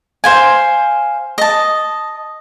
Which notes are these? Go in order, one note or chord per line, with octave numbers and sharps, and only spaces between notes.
C5 F5 G#5
D#5 A5